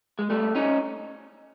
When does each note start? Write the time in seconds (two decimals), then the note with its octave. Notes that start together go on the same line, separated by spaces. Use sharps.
0.19 G#3
0.30 G3 A3
0.55 C#4 D#4